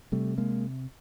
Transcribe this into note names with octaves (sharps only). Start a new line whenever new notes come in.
C3 G3 A3
G#3 A#3